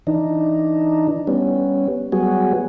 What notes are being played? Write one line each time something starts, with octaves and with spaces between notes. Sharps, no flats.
E3 D4 D#4
G3 B3 C#4
F#3 G3 B3 F#4 G#4